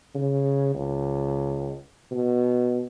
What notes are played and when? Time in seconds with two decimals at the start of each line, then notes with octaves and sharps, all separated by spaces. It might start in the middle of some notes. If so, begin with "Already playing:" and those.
0.15 C#3
0.75 C#2
2.12 B2